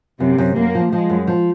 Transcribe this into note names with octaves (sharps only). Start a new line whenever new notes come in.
F#2 C3
F#2
F#2 A#3
F3
F3 G#3
F#2
F3